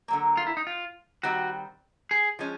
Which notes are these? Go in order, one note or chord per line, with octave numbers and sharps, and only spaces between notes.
D3 F#3 A#3
F4
E4
D#4
F4
D#3 G3 C4 F#4
G#4
F3 G#3 C#4